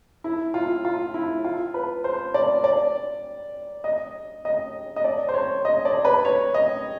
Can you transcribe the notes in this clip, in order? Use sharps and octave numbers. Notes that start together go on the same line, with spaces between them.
E4
F4
F4
E4
F4
B4
C5
D5
D5
D#5
D#5
D#5
D5
C5
C#5
D#5
D5
B4
C#5
D#5